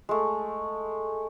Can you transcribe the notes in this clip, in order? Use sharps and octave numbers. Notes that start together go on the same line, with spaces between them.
G#3 A3